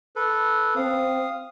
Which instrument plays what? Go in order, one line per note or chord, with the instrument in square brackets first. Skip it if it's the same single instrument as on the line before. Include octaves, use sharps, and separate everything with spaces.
[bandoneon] A4 B4
[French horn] C4 [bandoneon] F5 D#6